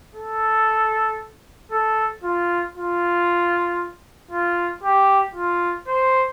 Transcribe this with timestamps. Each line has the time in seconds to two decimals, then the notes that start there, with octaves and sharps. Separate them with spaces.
0.16 A4
1.72 A4
2.24 F4
2.76 F4
4.32 F4
4.83 G4
5.35 F4
5.88 C5